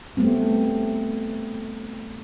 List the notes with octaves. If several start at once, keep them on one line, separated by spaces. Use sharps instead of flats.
G3 A3 B3 C4